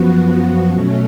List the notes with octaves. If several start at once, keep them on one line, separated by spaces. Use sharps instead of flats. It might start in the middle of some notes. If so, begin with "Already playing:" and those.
Already playing: F#2 F3 B3 F#4
B2 F#3 A3 C#4